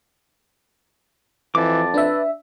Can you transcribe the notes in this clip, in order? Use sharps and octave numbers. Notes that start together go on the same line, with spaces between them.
F2 E3 A5 D6
D4 B4 E5